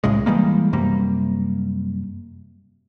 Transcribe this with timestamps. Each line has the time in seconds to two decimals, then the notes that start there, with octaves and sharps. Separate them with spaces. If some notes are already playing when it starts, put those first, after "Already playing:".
0.04 C2 A2 C#3 G#3
0.26 E3 G3 G#3 A#3
0.73 F#2 C3 G3 A#3